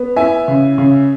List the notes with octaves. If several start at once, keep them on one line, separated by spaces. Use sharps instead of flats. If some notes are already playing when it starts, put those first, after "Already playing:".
Already playing: B3
E4 E5 G#5
C#3
C#3